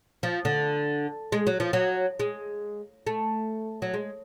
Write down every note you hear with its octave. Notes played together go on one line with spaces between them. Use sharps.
F3
D3
G#3
F#3
F3
F#3
G#3
A3
F#3
G#3